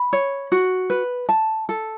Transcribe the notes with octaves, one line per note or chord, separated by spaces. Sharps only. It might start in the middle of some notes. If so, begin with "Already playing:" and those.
Already playing: B5
C#5
F#4
B4
A5
A4